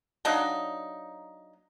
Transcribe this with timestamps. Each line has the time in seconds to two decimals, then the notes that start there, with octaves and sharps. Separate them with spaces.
0.25 F#3 A#3 D4 D#4